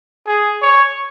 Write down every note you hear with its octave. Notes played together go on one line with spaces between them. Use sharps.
G#4
C#5